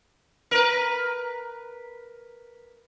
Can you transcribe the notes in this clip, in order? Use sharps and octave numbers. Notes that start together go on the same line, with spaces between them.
A#4 B4